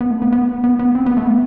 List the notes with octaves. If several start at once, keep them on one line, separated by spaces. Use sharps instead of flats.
B3
A3
B3
B3
B3
B3
C4
B3
A3
B3